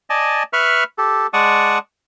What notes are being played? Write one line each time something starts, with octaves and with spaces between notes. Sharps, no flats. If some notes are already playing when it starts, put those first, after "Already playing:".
D5 D#5 G#5 A5
B4 E5 B5 C#6 F6
G4 A4
G#3 D5 F#5 A5 C#6 D#6